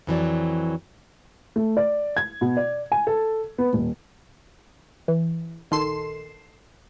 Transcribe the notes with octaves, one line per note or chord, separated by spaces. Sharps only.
F2 E3 F#3 D5
A3
D5
G#6
B2
D5
G#5
A4
B3
D#1
E3
A#1 D#3 A4 C6 C7 E7